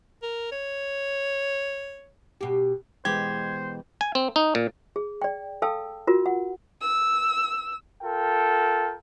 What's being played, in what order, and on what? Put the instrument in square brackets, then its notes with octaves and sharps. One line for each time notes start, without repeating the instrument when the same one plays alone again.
[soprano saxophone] A#4
C#5
[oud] B2 G4
[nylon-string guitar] B2 E3 G#3 [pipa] G4 [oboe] C5 [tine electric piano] G#6
[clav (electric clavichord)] G#5
C4
D#4
A#2
[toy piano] G#4
D5 G5
A4 F5 G5 A5 E6
F4 F#4 A#4
F#5
[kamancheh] E6
[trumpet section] F4 A4 A#4 G5